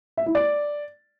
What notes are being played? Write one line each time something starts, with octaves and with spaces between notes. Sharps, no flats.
E5
E4
D5